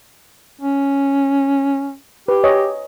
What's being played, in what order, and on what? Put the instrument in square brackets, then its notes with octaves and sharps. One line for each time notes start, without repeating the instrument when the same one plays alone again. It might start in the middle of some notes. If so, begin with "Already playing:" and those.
[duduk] C#4
[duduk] G4 [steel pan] B4
[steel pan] C#5 D#5 G#5